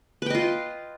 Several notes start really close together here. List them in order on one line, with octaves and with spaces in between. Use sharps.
B4 G5 D#5 F4